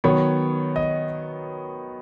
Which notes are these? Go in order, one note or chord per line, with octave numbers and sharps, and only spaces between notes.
D#3 F#3 B3 C#5
D#5